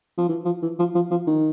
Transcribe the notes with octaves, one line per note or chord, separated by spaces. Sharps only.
F3
E3
F3
E3
F3
F3
F3
D#3